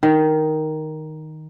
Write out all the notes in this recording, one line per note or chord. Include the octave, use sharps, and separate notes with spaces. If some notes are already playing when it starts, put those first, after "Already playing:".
D#3